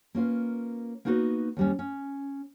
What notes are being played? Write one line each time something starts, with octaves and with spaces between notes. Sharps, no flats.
A#3 C#4 F4 B4
A#3 B3 D#4 F#4 A4 B4
D#2 G3 C#4
C#4